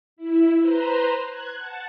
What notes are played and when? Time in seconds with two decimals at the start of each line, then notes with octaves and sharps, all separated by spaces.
0.16 E4
0.59 B4 C5 A#5 C6
1.25 F#6 G#6
1.58 F#5 A5